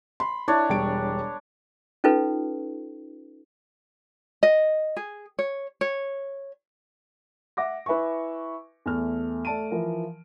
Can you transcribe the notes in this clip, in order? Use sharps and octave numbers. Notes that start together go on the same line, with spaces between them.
B5 C6
D4 E4 C#5
E1 G3 D7
C#4 D#4 F4 A4 B4
D#5
G#4
C#5
C#5
E5 F#5 D6 A#6
E4 B4 E5 G#5 C#6
E2 A3 F6
A3 D5 A5 D7 D#7
E3 F3 A#4